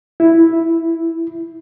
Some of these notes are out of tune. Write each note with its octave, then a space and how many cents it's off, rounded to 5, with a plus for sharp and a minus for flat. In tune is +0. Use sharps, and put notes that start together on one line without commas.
E4 +0